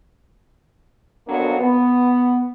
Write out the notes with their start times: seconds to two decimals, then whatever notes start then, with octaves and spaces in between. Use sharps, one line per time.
1.28 F2 D3 F#3 A#3 B3 D4
1.60 B3